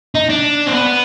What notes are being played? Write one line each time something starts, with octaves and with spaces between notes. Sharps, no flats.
D#4
D4
C4
B3